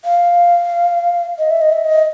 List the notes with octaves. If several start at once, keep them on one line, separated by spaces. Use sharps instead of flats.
F5
D#5
E5
D#5
E5
D#5